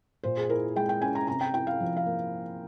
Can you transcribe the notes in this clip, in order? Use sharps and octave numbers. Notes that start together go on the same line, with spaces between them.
A#2 C5
G#4
E4 A#4
G#3 G5
G5
C#4 G#5
A#5
C3 A#5
G5
E4 G5
F5
F3
F5
A#3